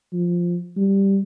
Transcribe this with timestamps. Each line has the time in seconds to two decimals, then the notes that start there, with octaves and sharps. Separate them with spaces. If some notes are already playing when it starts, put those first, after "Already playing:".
0.13 F3
0.77 G3